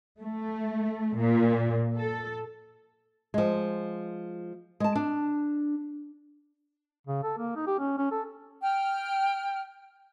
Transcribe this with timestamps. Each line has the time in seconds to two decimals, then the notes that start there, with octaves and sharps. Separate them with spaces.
0.20 A3
1.17 A#2
1.98 A4
3.34 F3 G#3
4.80 G#3 A5
4.95 D4
7.07 C#3
7.23 A4
7.38 A#3
7.56 D#4
7.67 G4
7.79 C#4
7.98 C#4
8.12 A4
8.62 G5 F6